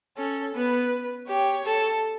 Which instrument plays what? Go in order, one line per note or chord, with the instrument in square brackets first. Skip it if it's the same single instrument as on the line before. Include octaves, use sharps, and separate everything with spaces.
[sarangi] C#4 [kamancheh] A4
[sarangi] B3 [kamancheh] B4
[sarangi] G4 [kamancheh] C#5
[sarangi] A4